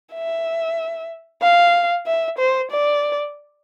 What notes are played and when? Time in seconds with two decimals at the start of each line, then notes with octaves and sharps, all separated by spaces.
0.14 E5
1.42 F5
2.06 E5
2.38 C5
2.71 D5